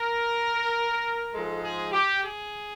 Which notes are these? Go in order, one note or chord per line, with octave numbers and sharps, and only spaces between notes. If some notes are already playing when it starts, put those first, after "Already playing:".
Already playing: A#4
G#2 F3 G#3 A4
G#4
G4
G#4